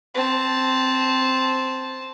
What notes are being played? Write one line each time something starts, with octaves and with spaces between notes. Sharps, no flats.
C4 A5